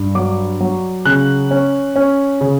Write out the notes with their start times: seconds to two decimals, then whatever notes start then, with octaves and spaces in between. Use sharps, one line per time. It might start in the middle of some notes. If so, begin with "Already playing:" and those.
Already playing: G2
0.15 F#3 D6
0.60 F#3
1.05 C#3 F#6
1.51 C#4
1.96 C#4
2.41 C#3